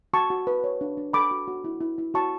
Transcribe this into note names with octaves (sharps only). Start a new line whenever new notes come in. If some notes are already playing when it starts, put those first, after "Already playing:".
F#4 A5 C#6
F#4
B4
C#5
D4
D4
A4 B5 D6
F#4
F#4
E4
E4
E4
F#4 A5 C#6